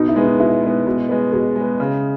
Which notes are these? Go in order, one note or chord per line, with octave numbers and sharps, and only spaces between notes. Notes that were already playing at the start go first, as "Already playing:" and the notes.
Already playing: B2 D#4
E4
G#3 B3
D#4
B2 E4
G#3 B3
B2
G#3 B3
B2 G#4
G#3 B3
C#3